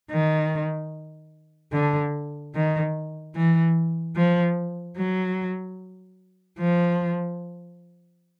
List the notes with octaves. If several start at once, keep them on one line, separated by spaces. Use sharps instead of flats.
D#3
D3
D#3
E3
F3
F#3
F3